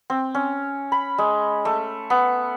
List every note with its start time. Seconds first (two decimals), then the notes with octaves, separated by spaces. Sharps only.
0.10 C4
0.35 C#4
0.92 B5
1.18 G#3
1.65 A3
2.10 B3